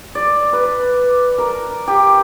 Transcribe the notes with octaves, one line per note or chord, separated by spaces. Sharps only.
D5
B4
A#4
G4